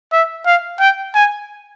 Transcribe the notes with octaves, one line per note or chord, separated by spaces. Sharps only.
E5
F5
G5
G#5